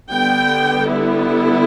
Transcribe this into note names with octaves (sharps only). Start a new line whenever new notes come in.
D3 G3 B3 G5
E4